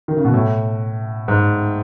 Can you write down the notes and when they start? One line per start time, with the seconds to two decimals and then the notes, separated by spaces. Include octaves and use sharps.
0.08 D#3
0.17 C#3
0.25 B2
0.34 A2
1.28 G#2